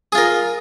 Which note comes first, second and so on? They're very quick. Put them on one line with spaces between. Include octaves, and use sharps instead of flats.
G#4 F4 A#4